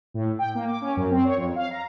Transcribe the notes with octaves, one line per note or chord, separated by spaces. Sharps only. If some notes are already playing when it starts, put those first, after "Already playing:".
A2
G5
A#3
D6
C#4
F#2
C4
C#5
F2
F5
A#5